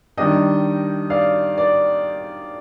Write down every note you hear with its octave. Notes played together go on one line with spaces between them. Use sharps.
D#3 G3 D4 D#5 G5
D5 F5
D5